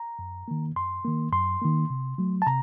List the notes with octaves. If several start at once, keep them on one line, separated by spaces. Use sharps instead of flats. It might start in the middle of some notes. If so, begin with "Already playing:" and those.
Already playing: A#5
F#2
D#3 A#3
F#2 C6
D#3 A#3
F#2 C6
D#3 A#3
C3
F#3 A3
A5
C3 A#5